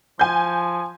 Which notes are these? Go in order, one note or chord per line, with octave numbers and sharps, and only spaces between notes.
F3 G#5 G6